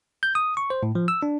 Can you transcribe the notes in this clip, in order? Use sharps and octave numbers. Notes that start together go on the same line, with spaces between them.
G6
D#6
C#6
C5
A2
F3
E6
D4